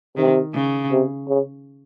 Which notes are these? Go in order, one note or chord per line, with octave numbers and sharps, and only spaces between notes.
C3 D#3
C#3
C3
C#3